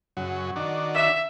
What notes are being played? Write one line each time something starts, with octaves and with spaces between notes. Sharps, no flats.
F#2 C#3 F#3
D#3 D4 F#4
E5